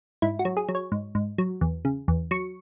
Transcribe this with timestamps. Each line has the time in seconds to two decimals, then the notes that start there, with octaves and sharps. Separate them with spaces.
0.22 G#2 E4
0.39 F#4
0.45 F#3
0.57 G#4
0.69 F#3
0.75 C#5
0.92 G#2
1.15 G#2
1.38 F#3
1.61 E2
1.85 C#3
2.08 E2
2.31 F#3 C#6